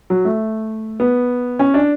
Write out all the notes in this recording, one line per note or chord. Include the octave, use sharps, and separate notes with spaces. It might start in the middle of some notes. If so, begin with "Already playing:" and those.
F#3
A3
B3
C#4
D4